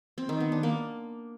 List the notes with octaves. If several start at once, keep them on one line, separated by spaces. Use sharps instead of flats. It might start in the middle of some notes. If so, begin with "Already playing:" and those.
C4
D#3
B3
D4
A#3